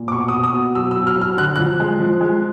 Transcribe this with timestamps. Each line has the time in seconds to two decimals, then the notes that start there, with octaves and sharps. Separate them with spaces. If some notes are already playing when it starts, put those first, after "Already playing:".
Already playing: A#2
0.08 D6
0.12 B2 C#6
0.28 D#6
0.33 B2
0.44 D#6
0.54 B2
0.75 F#3 E6
0.91 E6
0.96 F#3
1.07 F6
1.16 F#3
1.21 F6
1.37 D3 F#6
1.56 F3 F#6
1.80 G#3
2.00 F3
2.21 G#3